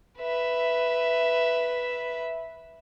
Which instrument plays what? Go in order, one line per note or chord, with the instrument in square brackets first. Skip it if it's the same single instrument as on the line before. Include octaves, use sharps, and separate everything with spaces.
[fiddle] B4 E5